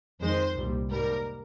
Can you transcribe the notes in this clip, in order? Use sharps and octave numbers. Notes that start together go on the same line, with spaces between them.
F2 D#3 G#3 C5
C2 A#2 G3
G#2 G3 A#3 A#4